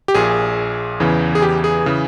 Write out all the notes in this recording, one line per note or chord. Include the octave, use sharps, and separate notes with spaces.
G4
A#1 A#2 G#4
E2 C#3 E3
G#4
G4
G#4
C#3 E3